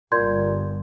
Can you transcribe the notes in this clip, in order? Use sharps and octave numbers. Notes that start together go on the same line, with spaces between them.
G1 A#2 C6 G6 G#6